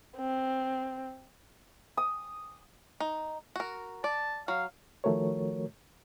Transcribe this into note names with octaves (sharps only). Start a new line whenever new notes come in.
C4
D#6
D#4
F#4 A#4
D5 A5
F#3 F5
D#3 F3 A3 F#4 A#4 C#5